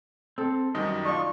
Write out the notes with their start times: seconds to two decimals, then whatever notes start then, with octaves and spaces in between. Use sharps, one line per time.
0.38 C4 A4
0.75 F#2 D#3 G3 D#5
1.05 D4 F4 C#6